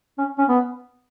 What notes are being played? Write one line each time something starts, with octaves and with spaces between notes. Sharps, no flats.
C#4
C#4
B3